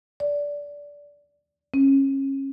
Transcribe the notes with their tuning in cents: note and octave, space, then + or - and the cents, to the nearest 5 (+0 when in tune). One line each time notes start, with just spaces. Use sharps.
D5 -15
C#4 -30